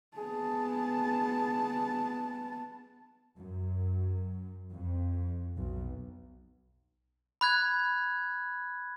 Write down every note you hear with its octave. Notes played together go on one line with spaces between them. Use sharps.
B3 G#4 A5
F#2
F2
B1
B5 F#6 G#6